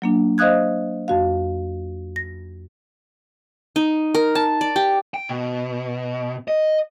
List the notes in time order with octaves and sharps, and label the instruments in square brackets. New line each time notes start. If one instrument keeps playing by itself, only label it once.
[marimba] F#3 A#3 D4
C5 D#5 F5 D#6 F#6 G#6
F2 F#4 F5
A#6
[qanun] D#4
A#4
A5
D5
G4
[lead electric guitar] G5
B2
D#5